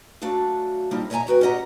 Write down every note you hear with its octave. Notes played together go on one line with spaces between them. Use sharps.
F#2 A3 D4 F#4 F5
D3 F3 G3 A#3 C4 D#4
C#5 D#5 E5 G5 G#5 A#5
D#2 F#4 B4 G5
C#4 G4 D#5 F#5 A#5